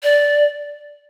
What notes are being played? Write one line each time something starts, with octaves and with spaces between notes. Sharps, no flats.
D5